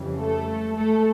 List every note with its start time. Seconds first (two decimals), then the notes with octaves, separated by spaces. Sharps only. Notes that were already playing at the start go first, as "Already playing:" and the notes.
Already playing: F2 C#3 E3 G3
0.18 A3 A4
0.76 A3 A4